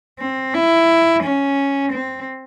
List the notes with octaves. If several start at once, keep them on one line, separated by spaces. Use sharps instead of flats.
C4
E4
C#4
C4